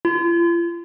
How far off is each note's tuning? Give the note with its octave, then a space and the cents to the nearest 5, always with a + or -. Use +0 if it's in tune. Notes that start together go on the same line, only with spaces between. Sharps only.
F4 -40